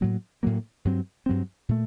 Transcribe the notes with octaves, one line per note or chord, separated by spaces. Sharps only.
A2 F#3 A#3
A2 F#3 A#3
G2 F#3 C4
G2 F#3 C4
A#2 A3